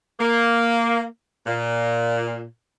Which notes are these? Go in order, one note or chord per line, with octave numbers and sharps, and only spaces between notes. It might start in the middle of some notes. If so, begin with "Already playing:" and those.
A#3
A#2